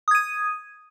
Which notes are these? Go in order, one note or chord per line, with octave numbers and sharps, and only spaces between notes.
D#6 G#6 D#7